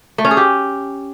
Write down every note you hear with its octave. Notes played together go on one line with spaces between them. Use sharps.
A3
C#4
G#4
G4